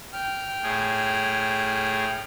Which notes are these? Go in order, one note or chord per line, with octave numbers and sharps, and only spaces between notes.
G5 F6
A2 G#4